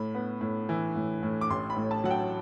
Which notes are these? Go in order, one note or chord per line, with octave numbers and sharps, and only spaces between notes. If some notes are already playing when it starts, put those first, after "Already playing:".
Already playing: A2 B5
B3
A2
E3
A2
A2
D6
A1 C6
B5
A2
A5
F#3 F#5
G5